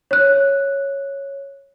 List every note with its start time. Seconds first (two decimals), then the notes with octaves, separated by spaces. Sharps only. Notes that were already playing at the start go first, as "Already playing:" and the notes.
0.11 C#5 F#6